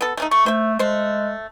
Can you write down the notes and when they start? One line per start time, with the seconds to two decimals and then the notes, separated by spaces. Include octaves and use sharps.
0.01 B3 A4
0.17 A3 C#4 D#4
0.31 A3 C#6
0.46 A3 C5 E5
0.79 G#3 A3 C5